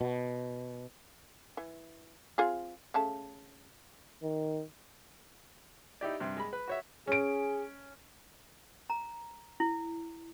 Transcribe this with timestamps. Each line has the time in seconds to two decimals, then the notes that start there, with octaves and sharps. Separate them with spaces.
0.01 B2
1.57 E3
2.38 C4 F4 G#4
2.94 C#3 A3 A5
4.23 D#3
6.01 D#4 E4 G4 D5
6.20 G2 C3
6.37 G#3 B5
6.53 B4
6.68 F#4 C#5 E5
7.07 C#4 G#4 D7
8.90 A#5
9.60 E4